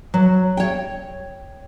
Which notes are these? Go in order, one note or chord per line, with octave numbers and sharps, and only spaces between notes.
F#3
C#5 G5